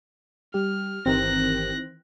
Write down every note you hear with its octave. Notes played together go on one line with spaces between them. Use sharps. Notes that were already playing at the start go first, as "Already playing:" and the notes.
G3 G4 F6
G1 D#3 E3 C4 G4 A#4 F#6 A#6